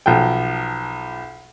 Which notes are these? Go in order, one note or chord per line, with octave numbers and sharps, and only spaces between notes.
B1 F3 G5